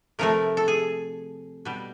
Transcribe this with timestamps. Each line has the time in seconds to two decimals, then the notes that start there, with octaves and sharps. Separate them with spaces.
0.19 C3 F3 A3 A#4
0.57 A4
0.68 G#4
1.65 B2 G3